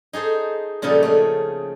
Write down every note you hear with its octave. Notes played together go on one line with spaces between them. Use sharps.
D#4 G#4 A4 C5
A#2 C#3 F3 G3 D#4 A4
A3 C#4